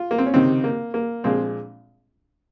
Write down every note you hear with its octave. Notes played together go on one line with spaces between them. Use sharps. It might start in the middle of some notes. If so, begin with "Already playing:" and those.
Already playing: F4
A#3
C4
C#4
C#2 C3 D#3 C4 D#4
A#3
A#3
A#1 A#2 F3 G#3 C4